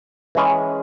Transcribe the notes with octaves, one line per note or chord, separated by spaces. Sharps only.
E3 G#3 C#4 G#4